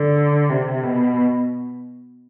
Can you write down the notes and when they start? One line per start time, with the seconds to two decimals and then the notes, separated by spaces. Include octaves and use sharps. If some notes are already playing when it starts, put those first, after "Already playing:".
Already playing: D3
0.50 C3
0.84 B2